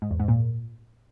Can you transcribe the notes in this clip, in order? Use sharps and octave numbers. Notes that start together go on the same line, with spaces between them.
G#2
E2
G#2
A#2